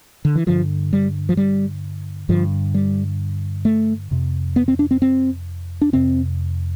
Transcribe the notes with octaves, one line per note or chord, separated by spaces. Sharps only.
D3
E3
G2 D3 F3
G3
F3
G3
G2 D3 F3
G3
A3
F2 C3
B3
C4
D4
C4
C4
D4
F2 C3 C4